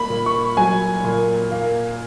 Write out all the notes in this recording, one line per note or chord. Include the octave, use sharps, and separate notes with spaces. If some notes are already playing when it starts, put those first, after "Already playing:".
Already playing: A#3 B5
A#2
C#6
F#3 G#5
A#2
A#3